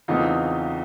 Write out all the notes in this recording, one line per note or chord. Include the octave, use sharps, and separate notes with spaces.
E2 C#3 E3 A3 C4 D#4 F4